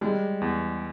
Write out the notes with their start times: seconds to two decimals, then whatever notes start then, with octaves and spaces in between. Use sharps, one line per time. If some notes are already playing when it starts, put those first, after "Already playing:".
0.01 G3 G#3
0.42 E2